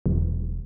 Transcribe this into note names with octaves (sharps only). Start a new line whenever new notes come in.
E1